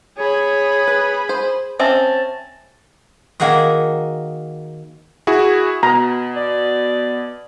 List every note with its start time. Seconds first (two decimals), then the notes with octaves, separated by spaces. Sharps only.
0.18 G#4 C#5 B5
0.87 B4
1.29 C5
1.80 C4 C#4 E5 A5
3.40 D#3 A#3 F#4 G#4 D#5
5.27 E4 F#4 G#4
5.83 B2 A#5
6.36 D5